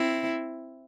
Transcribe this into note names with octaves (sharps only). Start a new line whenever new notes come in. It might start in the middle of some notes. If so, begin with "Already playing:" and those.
Already playing: C4 E4